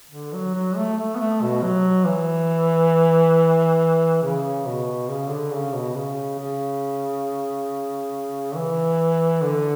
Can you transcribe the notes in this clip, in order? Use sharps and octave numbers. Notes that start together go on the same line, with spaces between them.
D3
F#3
F#3
A3
A3
B3
A3
B2
F#3
E3
C#3
B2
C#3
D3
C#3
B2
C#3
C#3
E3
D3